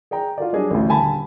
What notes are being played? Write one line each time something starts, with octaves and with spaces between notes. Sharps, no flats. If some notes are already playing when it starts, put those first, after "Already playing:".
G#4 D5 G5 A#5
F4 F#4 A4 D5
F#3 G3 D4 G#4 D#5
A1 D2
D#1 D3 G#5 A5 B5